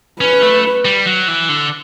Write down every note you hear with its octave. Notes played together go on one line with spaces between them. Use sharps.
C#4 B4
A3
G3
F#3
E3
D3